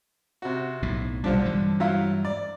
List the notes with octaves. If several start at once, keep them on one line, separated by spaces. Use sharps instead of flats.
C3 F#4
B1 A2
B1 A#2 D3 F3 G3 D4
G2 E3 G#3
F#3 E4 F4
D5